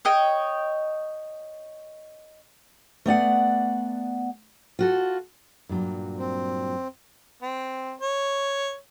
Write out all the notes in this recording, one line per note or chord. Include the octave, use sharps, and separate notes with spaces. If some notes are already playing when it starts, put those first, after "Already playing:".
C#5 D#5 G5
A3 B3 D5 F#5
F4 F#4 A4
G2 A#2 F#3
C4
C4
C#5